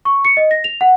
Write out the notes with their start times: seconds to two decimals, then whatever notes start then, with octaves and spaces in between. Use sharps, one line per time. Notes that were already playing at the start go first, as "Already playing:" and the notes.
0.05 C#6
0.25 C#7
0.37 D#5
0.51 A#6
0.64 F7
0.81 F#5